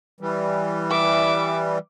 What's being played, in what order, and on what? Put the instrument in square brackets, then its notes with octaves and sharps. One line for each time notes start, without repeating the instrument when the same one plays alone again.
[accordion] E3 G3
[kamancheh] E5 D6